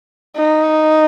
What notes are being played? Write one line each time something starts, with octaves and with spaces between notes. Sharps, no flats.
D#4